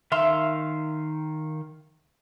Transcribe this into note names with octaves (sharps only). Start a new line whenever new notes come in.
D#3 E5 F5 C6